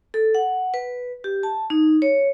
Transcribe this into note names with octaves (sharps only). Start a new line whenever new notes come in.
A4
F#5
B4
G4
A5
D#4
C#5